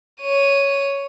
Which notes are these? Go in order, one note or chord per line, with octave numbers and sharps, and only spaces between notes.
C#5 D#7